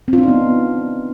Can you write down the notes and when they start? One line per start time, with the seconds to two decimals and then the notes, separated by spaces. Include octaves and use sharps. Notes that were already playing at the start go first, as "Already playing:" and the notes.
0.08 C4
0.13 F4
0.18 D4
0.23 D#4
0.28 B3